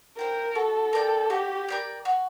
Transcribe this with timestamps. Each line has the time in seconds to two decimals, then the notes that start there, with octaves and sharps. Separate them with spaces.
0.18 A#4 C5 G5
0.55 F#4 A4
0.93 A#4 D5 G5
1.30 F#4 G4
1.68 A#4 D5 G5
2.05 F#4